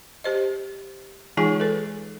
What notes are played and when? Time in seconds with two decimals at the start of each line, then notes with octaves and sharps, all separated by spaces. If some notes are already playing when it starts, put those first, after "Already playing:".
0.24 G4 C5 D#5
1.37 E3 G#3 D#4 F4 G#4 G#5
1.60 A4 B4